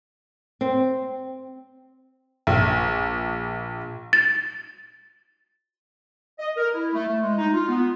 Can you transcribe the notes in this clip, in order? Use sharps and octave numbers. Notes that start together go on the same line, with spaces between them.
C4
A#1
A6
D#5
A#4
E4
A3
A3
G#3
D#4
F4
B3